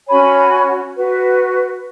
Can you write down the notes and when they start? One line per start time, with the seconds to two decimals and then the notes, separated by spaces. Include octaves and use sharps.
0.07 C#4 F#4 C#5 G#5 B5
0.96 F#4 B4